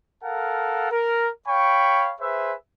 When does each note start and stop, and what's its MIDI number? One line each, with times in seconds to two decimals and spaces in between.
0.24 0.90 69
0.24 0.90 70
0.24 0.90 77
0.24 0.90 78
0.24 0.90 81
0.91 1.30 70
1.47 2.14 73
1.47 2.14 77
1.47 2.14 79
1.47 2.14 83
1.47 2.14 85
2.21 2.54 68
2.21 2.54 71
2.21 2.54 72
2.21 2.54 76